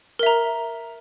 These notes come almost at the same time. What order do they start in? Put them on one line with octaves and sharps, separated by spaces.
A#4 E5 A#5